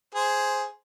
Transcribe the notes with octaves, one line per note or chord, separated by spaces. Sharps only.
G#4 C5